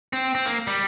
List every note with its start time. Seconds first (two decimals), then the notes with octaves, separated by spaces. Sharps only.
0.13 C4
0.35 C4
0.46 A#3
0.67 G3